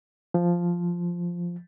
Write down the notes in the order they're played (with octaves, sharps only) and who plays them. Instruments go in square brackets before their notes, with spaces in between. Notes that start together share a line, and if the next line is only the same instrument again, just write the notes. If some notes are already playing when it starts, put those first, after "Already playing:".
[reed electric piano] F3